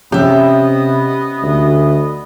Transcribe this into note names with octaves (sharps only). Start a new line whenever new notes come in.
C3 B3 C#4 G4 D#5 E5
D2